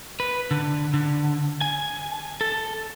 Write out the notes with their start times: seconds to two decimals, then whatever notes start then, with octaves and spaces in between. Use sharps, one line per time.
0.20 B4
0.51 D3
0.94 D3
1.61 G#5
2.41 A4